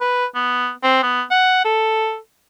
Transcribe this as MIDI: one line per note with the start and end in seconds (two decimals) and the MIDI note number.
0.01 0.25 71
0.35 0.70 59
0.83 1.01 60
1.03 1.22 59
1.31 1.65 78
1.65 2.17 69